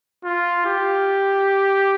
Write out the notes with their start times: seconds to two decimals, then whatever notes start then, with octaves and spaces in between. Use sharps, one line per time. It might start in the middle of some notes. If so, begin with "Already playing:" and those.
0.24 F4
0.65 G4